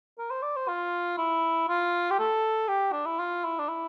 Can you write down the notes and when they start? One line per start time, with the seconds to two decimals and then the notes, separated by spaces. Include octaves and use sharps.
0.19 A#4
0.31 C5
0.42 D5
0.56 C5
0.68 F4
1.18 E4
1.68 F4
2.11 G4
2.19 A4
2.68 G4
2.93 D4
3.06 E4
3.19 F4
3.44 E4
3.60 D4
3.69 E4